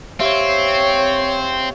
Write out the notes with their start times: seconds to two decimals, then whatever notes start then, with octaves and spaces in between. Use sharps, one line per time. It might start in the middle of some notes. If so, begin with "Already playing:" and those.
0.20 C4 G4 C#5 E5 F5